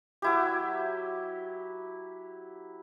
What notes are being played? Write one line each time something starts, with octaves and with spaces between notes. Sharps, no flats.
F#3 E4 G4